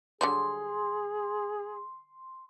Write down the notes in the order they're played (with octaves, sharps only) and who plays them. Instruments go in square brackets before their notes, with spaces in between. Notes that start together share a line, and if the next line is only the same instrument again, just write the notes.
[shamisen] D3 F#3 G3 [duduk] G#4 [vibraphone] C6